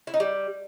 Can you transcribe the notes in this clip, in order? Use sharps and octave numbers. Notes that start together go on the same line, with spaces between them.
E4
D#4
G3